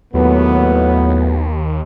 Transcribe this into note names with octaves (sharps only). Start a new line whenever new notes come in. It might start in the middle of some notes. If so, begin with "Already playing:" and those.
D#2 A2 F#3 B3